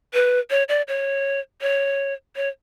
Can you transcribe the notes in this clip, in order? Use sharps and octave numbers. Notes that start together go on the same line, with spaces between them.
B4
C#5
D5
C#5
C#5
C#5